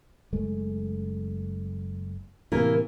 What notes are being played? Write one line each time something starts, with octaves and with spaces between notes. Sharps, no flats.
F#1 G#3 A3
A2 C3 E3 A#3 A#4